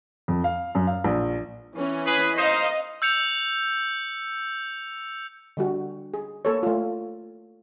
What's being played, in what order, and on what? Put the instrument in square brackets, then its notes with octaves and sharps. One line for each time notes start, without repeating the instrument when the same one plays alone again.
[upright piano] F2
F5
F#2
F5
A#1
[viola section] E3 C#4
[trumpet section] G#4 B4
[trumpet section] D#4 C5 [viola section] D#5 F5
[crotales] E6 G6 C#7 F7
[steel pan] D3 G3 F#4
G#4
A#3 A4 C#5
A3 F4